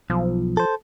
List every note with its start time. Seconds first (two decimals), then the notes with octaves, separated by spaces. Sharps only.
0.10 B1 F3
0.57 A4 C5